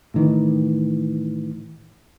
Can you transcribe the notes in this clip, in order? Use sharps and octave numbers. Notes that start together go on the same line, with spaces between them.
A2 D#3 E3